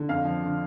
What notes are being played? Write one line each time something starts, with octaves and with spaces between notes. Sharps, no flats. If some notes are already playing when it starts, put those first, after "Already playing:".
Already playing: D3
F2 F5
F3
D3